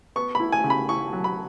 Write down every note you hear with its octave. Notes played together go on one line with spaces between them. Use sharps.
B3 C#6
E4 B5
G#5
C#3
B5
E4 C#6
F#3
B5